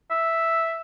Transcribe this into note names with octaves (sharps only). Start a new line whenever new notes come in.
E5